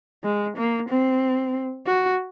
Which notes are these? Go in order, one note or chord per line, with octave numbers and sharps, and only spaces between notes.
G#3
A#3
C4
F#4